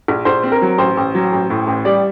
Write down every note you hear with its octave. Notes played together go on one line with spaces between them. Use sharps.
A#1
A#1 C5
C4
A#4
F#3
A1 C5
A1
F#3
A1
A2
A1
G3 D5